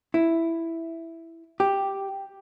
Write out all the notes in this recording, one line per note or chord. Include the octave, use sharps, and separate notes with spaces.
E4
G4